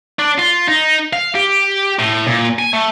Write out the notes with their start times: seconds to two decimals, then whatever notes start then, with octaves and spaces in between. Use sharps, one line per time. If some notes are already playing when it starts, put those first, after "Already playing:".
0.19 D4
0.39 F4
0.69 D#4
1.13 F5
1.35 G4
1.99 A2
2.27 A#2
2.59 G#5
2.73 A3